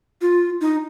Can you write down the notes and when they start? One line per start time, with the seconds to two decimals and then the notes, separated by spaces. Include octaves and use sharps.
0.22 F4
0.61 D#4